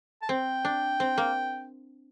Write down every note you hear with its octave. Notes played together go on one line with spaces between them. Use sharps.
A5
C4 G5
D4
C4
A#3